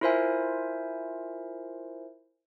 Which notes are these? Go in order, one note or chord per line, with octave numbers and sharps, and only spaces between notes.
E4 F4 A#4 C5 E5 G#5